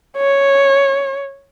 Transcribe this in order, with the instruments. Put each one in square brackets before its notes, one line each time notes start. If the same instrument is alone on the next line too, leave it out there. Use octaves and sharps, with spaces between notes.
[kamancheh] C#5